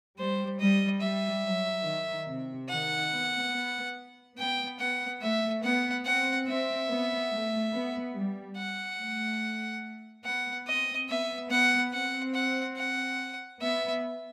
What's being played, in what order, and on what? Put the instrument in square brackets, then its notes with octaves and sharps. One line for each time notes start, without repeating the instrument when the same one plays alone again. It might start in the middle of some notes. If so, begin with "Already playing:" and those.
[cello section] G3 [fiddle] C5
[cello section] G3 [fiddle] D#5
[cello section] G3 [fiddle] E5
[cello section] F#3
D#3
C3
[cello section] D#3 [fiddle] F#5
[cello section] B3
B3
[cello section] B3 [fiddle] G5
[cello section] B3 [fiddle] F#5
[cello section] A3 [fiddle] E5
[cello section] B3 [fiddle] F#5
[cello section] C4 [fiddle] F#5
[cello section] C4 [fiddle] E5
[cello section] B3
A3
B3
G3
[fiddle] F#5
[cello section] A3
[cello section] B3 [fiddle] F#5
[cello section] C4 [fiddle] D#5
[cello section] B3 [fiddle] E5
[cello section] B3 [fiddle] F#5
[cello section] C4 [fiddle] F#5
[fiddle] F#5
F#5
[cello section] B3 [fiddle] E5